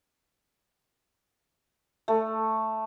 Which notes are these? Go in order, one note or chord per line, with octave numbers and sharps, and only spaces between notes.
A3